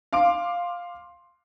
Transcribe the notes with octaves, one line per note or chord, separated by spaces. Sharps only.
F5 C6 D6 D7